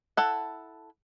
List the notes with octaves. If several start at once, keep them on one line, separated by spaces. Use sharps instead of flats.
E4 A4 F#5